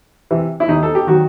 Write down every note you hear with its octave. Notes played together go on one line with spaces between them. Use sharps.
C3 E3
E4
D#2 D#4
A4
G4
D#3 F#3 F#4